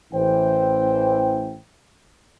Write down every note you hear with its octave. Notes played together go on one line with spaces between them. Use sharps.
A1 E3 C5 G5